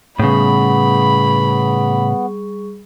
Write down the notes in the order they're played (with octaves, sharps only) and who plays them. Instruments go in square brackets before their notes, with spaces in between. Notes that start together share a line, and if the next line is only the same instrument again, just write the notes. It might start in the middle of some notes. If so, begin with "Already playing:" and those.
[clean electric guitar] A2 C#3 [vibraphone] G3 G#4 C#6 [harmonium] B3 [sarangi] B5